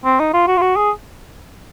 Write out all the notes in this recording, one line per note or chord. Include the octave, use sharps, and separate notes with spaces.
C4
D#4
F4
F#4
F4
F#4
G#4